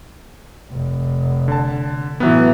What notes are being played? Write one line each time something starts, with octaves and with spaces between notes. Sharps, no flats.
F1
D3 A5
A2 E3 F#3 B3